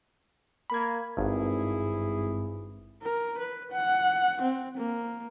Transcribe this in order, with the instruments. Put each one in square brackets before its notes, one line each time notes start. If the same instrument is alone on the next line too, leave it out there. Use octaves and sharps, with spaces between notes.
[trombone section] A#3 [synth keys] B5 G#6
[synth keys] G#1 G2 [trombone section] E4 G#4
[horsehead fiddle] A#4
B4
F#5
C4
A#3